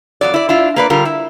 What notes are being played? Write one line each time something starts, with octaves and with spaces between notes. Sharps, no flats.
F2 C3 F#3 D5
E4 D5
D4 E4 F4
A#3 B4 D5
D3 G3 F4 A#4
E4